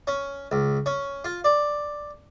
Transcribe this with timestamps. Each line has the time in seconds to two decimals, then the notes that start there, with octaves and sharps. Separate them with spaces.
0.07 C#4
0.52 C#2
0.86 C#4
1.25 F4
1.44 D5